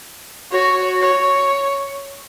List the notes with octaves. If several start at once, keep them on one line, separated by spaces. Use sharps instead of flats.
F#4 C#5
C#5